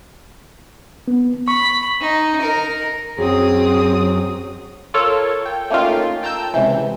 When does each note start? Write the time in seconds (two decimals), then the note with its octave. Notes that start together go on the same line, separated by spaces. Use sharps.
1.08 B3
1.48 B5 C#6
2.01 D#4
2.41 A#4
3.18 F#2 F#3 C4 G#4 D#6
4.94 F4 A4 A#4 C#5
5.46 G5
5.70 A3 A#3 C#4 D#4 F4 G5
6.23 G5 A5 A#5 E6 G6
6.54 C#2 C3 E3